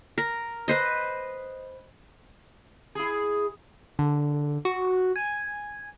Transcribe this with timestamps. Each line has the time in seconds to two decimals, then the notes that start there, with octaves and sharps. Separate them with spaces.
0.18 A#4
0.68 B4 C5 D#5
2.95 E4 G#4
3.99 D3
4.65 F#4
5.16 G#5